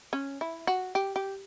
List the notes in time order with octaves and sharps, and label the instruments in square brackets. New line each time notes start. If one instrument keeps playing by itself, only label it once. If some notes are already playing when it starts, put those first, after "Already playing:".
[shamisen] C#4
E4
F#4
G4
G4